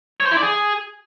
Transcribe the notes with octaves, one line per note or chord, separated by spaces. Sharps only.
C#5
C5
E4
D5
G#4